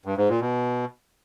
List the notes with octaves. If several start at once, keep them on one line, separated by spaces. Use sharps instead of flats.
G2
G#2
A#2
B2